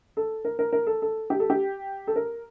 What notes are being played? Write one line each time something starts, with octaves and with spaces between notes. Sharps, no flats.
A4
A#4
A#4
A#4
A4
A4
G4
A4
G4
A4
A#4